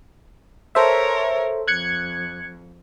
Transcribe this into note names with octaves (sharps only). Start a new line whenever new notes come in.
A4 A#4 C5 C#5 E5
F2 F#6 G#6 C#7